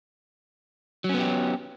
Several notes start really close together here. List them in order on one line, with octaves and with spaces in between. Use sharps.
F#3 C#4 B3 G4